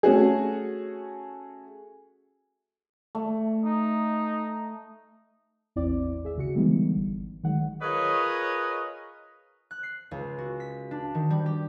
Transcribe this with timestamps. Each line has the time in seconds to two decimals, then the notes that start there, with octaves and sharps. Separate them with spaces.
0.03 A3 C#4 F#4 G#4
3.15 A3
3.65 D#4
5.76 A1 E2 C4 E4 D5 D6
6.23 G#1 G#4 E5
6.36 C#2 C#3 F#4 C#7
6.55 D3 E3 G3 G#3 B3 D#4
6.97 G#1
7.44 D#3 F#3 G#3 F#5
7.82 F4 G#4 A#4 B4 C#5 D#5
9.71 F#6
9.83 C7
10.11 C#2
10.38 F#4
10.60 B6
10.91 D4
11.15 D#3
11.30 G3
11.46 G4